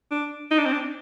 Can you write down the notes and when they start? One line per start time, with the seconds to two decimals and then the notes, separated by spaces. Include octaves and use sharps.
0.11 D4
0.51 D#4
0.59 D4
0.66 C4
0.73 D4